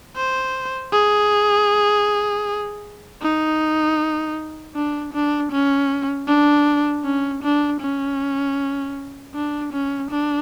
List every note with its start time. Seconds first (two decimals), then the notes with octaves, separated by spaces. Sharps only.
0.16 C5
0.92 G#4
3.22 D#4
4.75 D4
5.13 D4
5.52 C#4
6.28 D4
7.04 C#4
7.43 D4
7.81 C#4
9.35 D4
9.73 C#4
10.11 D4